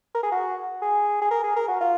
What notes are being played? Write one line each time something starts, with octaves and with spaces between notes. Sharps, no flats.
A#4
G#4
F#4
G#4
G#4
A#4
G#4
A#4
F#4
F4